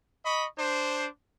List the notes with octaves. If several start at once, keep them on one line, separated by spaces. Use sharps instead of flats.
D#5 B5 C#6
D4 C5